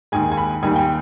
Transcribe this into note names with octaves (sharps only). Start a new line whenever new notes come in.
D#2 D#3 G#3 G#5
G#5
B5
D#2 D#3 G3 G#5
G5